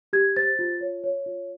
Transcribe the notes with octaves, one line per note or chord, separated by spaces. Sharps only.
G4 G#6
C5 A6
F4
C#5
C#5
F4